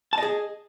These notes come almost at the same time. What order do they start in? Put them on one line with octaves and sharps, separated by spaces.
A5 D#5 G#4